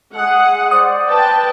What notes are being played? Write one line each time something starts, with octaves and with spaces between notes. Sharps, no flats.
G#3 G#4 F#5 D#6
C5 D5 D#6
B4 G5 A5